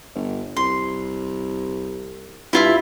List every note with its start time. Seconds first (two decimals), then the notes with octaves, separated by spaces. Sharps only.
0.15 G1
0.56 C2 C6
2.53 G2 E4 F4 E5